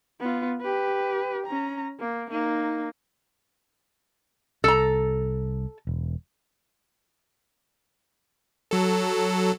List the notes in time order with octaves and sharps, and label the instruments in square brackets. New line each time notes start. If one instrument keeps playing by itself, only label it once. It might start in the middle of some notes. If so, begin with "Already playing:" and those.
[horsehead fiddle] B3 F4
G4 B4
C#4 A#5
A#3
A#3 D#4
[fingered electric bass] C2 [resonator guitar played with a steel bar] A4 A#5
[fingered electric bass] E1
[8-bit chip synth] F#3 A4